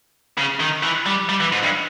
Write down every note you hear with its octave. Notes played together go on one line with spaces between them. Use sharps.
C#3
D#3
E3
G3
G3
E3
G#2
G2